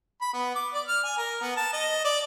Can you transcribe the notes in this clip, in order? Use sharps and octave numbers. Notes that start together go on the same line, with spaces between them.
B5
B3
D6
D5
F6
G#5
A#4
B3
A5
D#5
D5